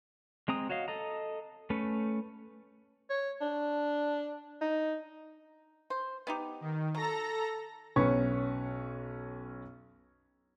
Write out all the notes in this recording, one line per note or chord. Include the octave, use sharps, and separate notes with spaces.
G#3 C4 A#5 D#6
F#4 C#5 D#5 F5
A4 D#5 A#5
A3 C#4 B4
C#5
D4
D#4
C5
B3 D#4 G4
D#3
F#3 A4 A#5 A#6
B1 C#4 B4 C#6